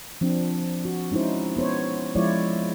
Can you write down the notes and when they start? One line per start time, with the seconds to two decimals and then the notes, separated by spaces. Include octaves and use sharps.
0.21 F3 C4 D4
0.85 F#4
1.11 G#3 C#4 D#4 E4 C5
1.57 B3 C5 C#5
2.15 F3 G#3 E4 F4 C#5 D5